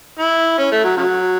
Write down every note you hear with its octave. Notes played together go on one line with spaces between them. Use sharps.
E4
C#4
A3
F#3
C#3 F#3